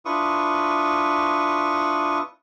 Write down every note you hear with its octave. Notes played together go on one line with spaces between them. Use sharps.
D4 E4 F4 B4 C#6 D#6